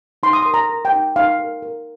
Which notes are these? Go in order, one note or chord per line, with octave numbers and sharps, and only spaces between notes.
D#4 C6
D#6
A#4 C6
A#5
A#4
G5
D#4
D#4 F5
A#4
A#4